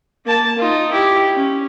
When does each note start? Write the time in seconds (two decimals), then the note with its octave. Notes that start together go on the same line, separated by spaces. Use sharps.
0.24 A#3 A5
0.58 D#4 F4
0.91 E4 G4
1.34 C#4